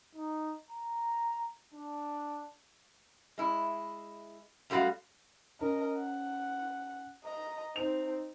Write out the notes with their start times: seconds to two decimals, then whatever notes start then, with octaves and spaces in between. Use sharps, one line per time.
0.15 D#4
0.71 A#5
1.75 D4
3.38 G#3 E4
4.70 F#2 G3 A3 F4 F#4 F5
5.61 C#4 A#4 D#5
5.97 F#5
7.24 D#5 A#5
7.76 C4 D#4 F7